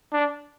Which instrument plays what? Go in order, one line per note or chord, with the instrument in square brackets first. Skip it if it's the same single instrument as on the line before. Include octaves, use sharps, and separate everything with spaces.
[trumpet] D4